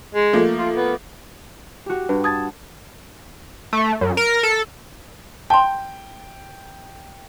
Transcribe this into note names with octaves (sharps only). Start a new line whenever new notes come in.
G#3
F3 A3 A#3
F4
B3
F#4 G4
G2 B4
A5 D#6 G#6 A6
A3
F#2
A#4
A4
G5 A5 C6